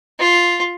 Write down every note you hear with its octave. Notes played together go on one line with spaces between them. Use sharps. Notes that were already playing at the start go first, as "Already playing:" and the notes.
F4